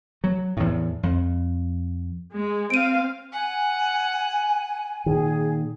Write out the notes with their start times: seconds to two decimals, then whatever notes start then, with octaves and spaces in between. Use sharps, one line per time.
0.24 F#3
0.57 E2 A2
1.03 F2
2.32 G#3
2.70 C4 F5 D7 D#7
3.32 F#5 G#5
5.06 A#2 D#3 G#4